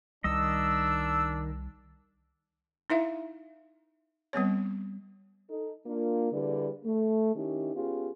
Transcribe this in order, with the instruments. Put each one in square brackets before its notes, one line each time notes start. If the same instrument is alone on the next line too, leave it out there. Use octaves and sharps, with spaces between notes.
[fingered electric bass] C2 G3 [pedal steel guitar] D#3 D#5 [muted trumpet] D4 [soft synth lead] E6
[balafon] D#4 E4 E5 F5
G3 B3 C4 C#5
[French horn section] D#4 A4
A#3 D4 F4
D3 G3 E4 G#4 B4 D5
A3
D#3 C#4 D#4 E4 G4
B3 C#4 F4 G4 G#4